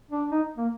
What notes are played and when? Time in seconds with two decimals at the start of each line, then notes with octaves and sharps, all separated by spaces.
0.11 D4
0.31 D#4
0.57 A#3